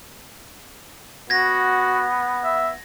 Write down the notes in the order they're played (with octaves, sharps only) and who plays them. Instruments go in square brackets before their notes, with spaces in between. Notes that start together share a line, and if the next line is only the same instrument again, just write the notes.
[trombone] B3 [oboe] F#4 [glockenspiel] G#6 A#6
[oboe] E5